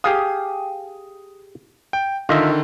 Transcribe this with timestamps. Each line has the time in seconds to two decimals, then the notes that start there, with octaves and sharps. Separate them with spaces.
0.04 G4 G#4 F5 D#6
1.93 G5
2.29 D3 D#3 F4 D#5 E5